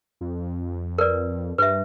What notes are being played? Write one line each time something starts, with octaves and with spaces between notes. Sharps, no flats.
F2
A#4 B4 D5
G2 B4 E5